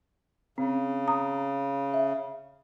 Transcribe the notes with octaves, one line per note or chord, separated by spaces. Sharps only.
C#3 C4
A#5 D#6
E5